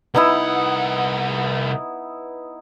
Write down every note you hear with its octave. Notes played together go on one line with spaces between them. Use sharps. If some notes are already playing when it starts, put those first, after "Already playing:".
C2 B3 D#4 E4 F#5